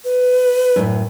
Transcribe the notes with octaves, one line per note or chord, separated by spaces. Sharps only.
B4
F#2 A2